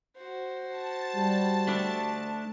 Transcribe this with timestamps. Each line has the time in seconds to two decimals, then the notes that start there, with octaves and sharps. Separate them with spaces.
0.17 F#4 C5
0.67 A5
1.16 G3
1.68 A3 D4